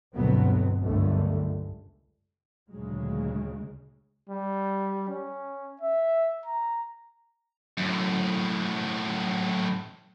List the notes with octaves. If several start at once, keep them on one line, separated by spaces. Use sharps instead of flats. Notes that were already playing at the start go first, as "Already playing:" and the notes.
G1 D2 B2 F#3 B3 C4
G1 C#2 F#2 D3 A3
D2 A#2 C#3 F#3 G#3
G3
C#4
E5
A#5
F#2 A2